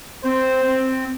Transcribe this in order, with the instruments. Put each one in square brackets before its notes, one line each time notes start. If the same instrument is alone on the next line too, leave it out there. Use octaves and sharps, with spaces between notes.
[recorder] C4 [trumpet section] C5
[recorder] C4